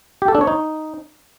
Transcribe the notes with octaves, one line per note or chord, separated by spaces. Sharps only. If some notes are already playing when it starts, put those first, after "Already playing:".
G4
A4
D4
C#5
D#4